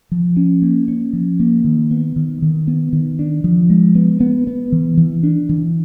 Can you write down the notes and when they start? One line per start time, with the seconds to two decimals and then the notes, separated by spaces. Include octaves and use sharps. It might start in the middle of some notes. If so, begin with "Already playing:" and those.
0.12 F3
0.37 C#4
0.62 A#3
0.88 C#4
1.13 F3
1.40 A#3
1.64 D#3
1.91 B3
2.16 D#3
2.42 D#3
2.67 B3
2.93 D#3
3.19 D4
3.44 F3
3.70 G#3
3.95 B3
4.20 B3
4.47 B3
4.72 E3
4.97 E3
5.23 D4
5.49 E3